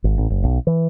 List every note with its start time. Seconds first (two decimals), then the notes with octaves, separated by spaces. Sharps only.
0.04 G#1
0.18 A1
0.30 F#1
0.44 B1
0.67 E3